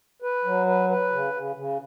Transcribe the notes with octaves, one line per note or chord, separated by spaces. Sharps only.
B4
F#3
B4
B4
C#3
C#3
C#3